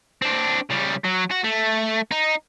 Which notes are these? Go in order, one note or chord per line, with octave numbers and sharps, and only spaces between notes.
C4 D4
C#3 G3
F#3
F#4
A3
D#4